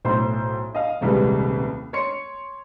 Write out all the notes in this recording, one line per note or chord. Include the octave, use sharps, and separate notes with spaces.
B1 A2 C5 C6
D#5 F5
D#1 C2 G3 G#3 B4
C#5 C6 C#7